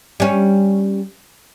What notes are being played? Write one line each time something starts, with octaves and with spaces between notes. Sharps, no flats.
G3 C#4